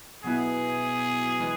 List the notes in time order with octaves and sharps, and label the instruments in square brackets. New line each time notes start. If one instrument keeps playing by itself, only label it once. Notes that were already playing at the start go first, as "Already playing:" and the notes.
[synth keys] B2 F#3 B3 E4 [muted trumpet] G#4
[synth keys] E3 G#3